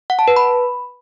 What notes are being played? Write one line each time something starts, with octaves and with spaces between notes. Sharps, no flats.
F#5
A5
B4
B5